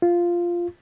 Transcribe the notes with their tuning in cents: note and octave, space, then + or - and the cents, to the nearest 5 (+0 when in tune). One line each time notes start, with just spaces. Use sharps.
F4 -5